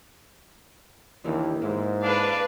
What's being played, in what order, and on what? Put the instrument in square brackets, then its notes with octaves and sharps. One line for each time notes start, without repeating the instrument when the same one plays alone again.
[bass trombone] D#2 [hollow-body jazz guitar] D3 E3 E4
[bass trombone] G#2 [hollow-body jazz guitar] A#3 E4
[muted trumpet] D4 [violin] B4 F5